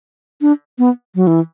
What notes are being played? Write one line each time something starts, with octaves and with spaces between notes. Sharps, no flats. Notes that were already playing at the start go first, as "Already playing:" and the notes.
D4
B3
F#3
E3